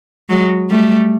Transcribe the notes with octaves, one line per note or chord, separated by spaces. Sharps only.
F#3 G#3
G3 A3